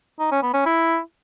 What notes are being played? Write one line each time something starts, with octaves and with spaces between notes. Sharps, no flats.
D#4
C#4
B3
C#4
E4